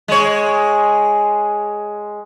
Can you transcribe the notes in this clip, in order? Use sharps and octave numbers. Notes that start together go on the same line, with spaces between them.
G#3 C#5